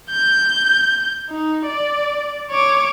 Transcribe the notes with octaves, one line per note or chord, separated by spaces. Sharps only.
G6
D#4
D5
C#5 D6